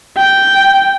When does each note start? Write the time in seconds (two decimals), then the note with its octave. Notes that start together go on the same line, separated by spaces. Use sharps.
0.17 G5